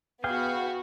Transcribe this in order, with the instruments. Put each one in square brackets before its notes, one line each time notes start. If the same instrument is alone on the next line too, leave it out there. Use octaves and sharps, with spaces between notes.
[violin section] B3 F#4 [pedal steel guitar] G#4 F5 G5